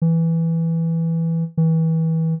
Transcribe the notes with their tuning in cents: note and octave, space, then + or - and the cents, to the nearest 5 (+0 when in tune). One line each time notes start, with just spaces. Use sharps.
E3 +0
E3 -30